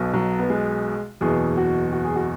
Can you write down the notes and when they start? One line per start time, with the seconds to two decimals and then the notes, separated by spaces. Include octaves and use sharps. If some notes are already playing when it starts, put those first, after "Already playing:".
Already playing: B1 B2
0.14 F#3
0.39 B3
0.50 G#3
1.21 F#1 E2 B2 G#4
1.57 F#4
1.93 F#4
2.04 G#4
2.16 F#4